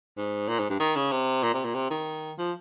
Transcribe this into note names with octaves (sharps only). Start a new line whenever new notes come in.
G#2
A#2
G#2
G2
D#3
C#3
C3
A#2
C3
A#2
C3
D#3
F3